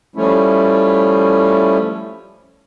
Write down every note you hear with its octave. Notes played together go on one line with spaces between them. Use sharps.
F3 G3 A3 C#4 E4